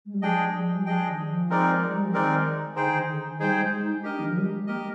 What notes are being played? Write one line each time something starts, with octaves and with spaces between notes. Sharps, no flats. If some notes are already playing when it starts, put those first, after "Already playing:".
G#3
G3
F3 D4 G#4 D#5 G5
F3
G3
F3 D4 G#4 D#5 G5
D#3
F3
G#3 C4 D#4 A#4 D5
G#3
G3
F3
D#3 G#3 C4 D#4 A#4 D5
D3 D#4 G#4 C5 G5
D#3
D3
D#3
G3 D#4 G#4 C5 G5
G3
G#3
D#4
D4 G4 A#4 D#5
D#3
F3
G3
G#3
A#3 G4 A#4 D#5